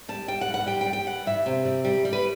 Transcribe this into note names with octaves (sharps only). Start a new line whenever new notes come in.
G3 A5
G3 G5
F#5
G2
F#5
G3 G5
G5
G3
G5
G2 F#5
G2 E5
C3
G3
G3
G3
B4